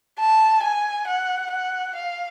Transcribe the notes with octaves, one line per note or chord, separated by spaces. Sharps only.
A5
G#5
F#5
F#5
F5